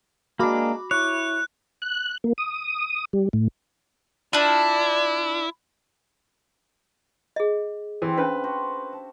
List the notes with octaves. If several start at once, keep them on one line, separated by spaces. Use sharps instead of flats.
G#3 A#3 D4 F#4 B5 D6
E4 C#5 F#6
F#6
A#3
D#6
G3
A2
D4 E4 F4 D5
G#4 D#5
E3 C4 G4
C#4 D4 B4 F5 A5
F#4 C5
A5